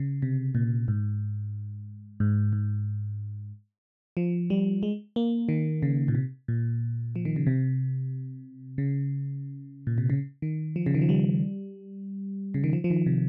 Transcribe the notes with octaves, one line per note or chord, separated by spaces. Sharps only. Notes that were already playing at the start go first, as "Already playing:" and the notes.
Already playing: C#3
C3
A#2
G#2
G#2
G#2
F3
G3
G#3
A#3
D#3
C#3
A#2
C3
A#2
F3
D#3
C#3
C3
C#3
A#2
C3
C#3
D#3
F3
C#3
D#3
F3
G3
C#3
D#3
F3
F3
D#3
C3